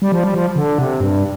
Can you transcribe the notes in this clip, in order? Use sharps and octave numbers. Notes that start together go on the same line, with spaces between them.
G3
F3
G3
F3
D3
C3
G2